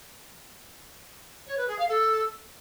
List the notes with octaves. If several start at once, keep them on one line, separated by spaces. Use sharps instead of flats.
C#5
B4
G#4
F5
A4